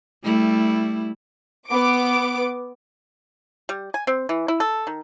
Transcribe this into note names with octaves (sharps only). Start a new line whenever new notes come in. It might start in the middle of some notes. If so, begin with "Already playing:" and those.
G3 A3 E4
B3 D6 D7
G3
G#5
C4
E3
E4
A4
D#3